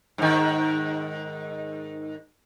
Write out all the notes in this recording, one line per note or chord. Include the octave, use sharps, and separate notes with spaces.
G#2 D#3